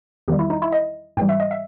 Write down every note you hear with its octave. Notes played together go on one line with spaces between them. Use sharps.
E2 D#3 G3 G4
E4
D#4
E4
D#5
G#2 E3 G3 G5
E5
D#5
E5